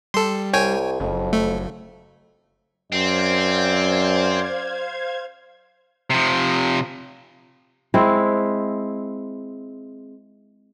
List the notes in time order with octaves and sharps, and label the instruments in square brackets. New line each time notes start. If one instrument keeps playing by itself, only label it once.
[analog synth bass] G3 [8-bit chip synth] A4 C6
[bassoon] C2 [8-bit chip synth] C#5 G5 G#5
[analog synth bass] F#1 [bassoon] F2
[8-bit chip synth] A3
[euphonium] F#2 [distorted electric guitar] C4 [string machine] C5 F5 G#6 [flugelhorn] D5
[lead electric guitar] C3 F3
[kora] G#3 C4 E4